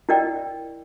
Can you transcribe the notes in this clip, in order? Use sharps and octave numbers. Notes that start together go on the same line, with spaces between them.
E4 A#4 D5 D#5 G5